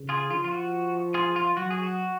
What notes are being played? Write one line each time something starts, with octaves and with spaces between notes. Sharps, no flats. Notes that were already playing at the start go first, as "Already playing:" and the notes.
Already playing: C#3
F4 G#4
F3 F4
F4
F#4
F4 G#4
F4
F#3 F#4
G#4
F#4